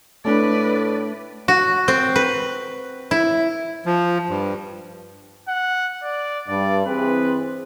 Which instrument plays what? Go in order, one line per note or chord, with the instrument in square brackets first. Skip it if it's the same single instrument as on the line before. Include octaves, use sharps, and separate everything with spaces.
[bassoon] A2 [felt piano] A3 D4 [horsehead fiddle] B4 D5
[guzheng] F#4
C4
B4
E4
[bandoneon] F3
G2
[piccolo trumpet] F#5
D5
[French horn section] G2 [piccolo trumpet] D5
[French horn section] E3 C4 G#4 [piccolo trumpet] B4